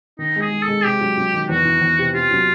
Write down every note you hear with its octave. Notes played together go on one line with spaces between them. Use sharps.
D#3 D#4
G#3
G#4
G#3
A4
G#3
C3 G4
F#3
F#3
D#3
E2 F#4
E3
E2
C3
C3 F4
F#3